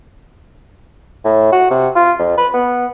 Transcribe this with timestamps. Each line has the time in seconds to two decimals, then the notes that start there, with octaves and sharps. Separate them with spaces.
1.25 A2
1.52 F#4
1.70 C3
1.95 F4
2.19 F2
2.38 B4
2.54 B3